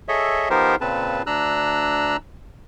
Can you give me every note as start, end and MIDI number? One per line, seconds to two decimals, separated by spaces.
0.08 0.49 68
0.08 0.49 69
0.08 0.49 73
0.08 0.49 75
0.08 0.49 76
0.50 0.76 53
0.50 0.76 59
0.50 0.76 63
0.50 0.76 67
0.50 0.76 70
0.50 0.76 72
0.81 1.22 46
0.81 1.22 49
0.81 1.22 60
0.81 1.22 71
0.81 1.22 81
1.27 2.17 38
1.27 2.17 62
1.27 2.17 82
1.27 2.17 88
1.27 2.17 90